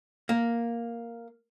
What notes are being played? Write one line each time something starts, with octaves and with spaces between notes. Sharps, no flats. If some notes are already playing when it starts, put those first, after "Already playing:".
A#3